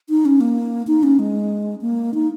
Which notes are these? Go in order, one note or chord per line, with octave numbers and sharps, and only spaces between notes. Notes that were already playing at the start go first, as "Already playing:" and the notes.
D#4
C#4
A#3
D#4
C#4
G#3
A#3
D#4